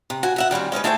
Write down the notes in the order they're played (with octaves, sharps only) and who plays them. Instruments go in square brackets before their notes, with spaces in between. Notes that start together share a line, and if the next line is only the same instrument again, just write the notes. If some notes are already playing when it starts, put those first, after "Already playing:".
[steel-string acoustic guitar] C3
F#4 G#5
F#4 E5 F#5
D#3 G3 C4 C#4
G#3 C#4 D#4 B4
A3 E4 G#4 A4 C5 G5